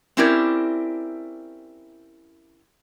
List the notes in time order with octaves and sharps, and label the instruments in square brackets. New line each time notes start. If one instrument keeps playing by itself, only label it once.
[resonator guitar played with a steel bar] C4 C#4 E4 G4 A#4 D5